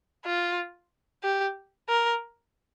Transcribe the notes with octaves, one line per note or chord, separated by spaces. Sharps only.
F4
G4
A#4